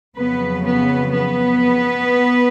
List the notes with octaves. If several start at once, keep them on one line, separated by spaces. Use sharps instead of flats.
F2 C#3 F#3 B3 B4
B3 B4
B3 B4